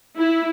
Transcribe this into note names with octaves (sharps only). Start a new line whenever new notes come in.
E4